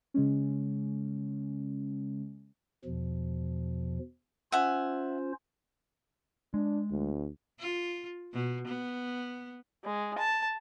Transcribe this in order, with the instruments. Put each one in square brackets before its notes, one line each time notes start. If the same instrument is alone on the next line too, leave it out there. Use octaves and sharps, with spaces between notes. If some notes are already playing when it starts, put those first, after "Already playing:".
[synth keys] C#3 G#3 C#4
[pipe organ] E2 B2 F3
[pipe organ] C#4 F4 C5 [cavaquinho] E5 F#5 G#5
[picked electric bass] G#3 [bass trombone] D4
[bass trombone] D2
[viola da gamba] F4
B2
B3
[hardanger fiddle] G#3
A5